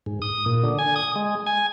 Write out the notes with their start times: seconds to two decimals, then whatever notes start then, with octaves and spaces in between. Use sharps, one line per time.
0.06 G#2
0.22 D#6
0.46 A#2
0.64 D3
0.79 G#5
0.96 D#6
1.16 G#3
1.47 G#5